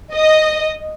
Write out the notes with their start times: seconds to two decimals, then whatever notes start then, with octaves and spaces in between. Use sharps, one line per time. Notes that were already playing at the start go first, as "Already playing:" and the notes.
0.14 D#5